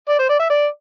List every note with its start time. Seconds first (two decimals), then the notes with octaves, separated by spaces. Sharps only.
0.09 D5
0.19 C5
0.29 D5
0.39 E5
0.50 D5